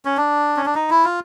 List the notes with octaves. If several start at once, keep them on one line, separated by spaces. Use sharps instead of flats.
C#4
D4
C#4
D4
D#4
E4
F4